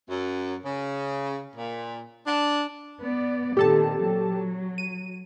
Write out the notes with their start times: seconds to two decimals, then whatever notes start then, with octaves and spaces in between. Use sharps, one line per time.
0.09 F#2
0.64 C#3
1.56 A#2
2.27 D4
2.99 B3 D5
3.57 A#2 D#3 C4 G4 A4 A5
4.04 F#3
4.78 D#7